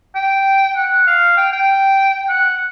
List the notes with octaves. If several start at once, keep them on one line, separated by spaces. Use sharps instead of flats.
G5
F#5
F5
G5
G5
F#5